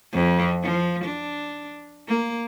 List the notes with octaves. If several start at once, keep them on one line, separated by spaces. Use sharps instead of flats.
F2
F3
D4
A#3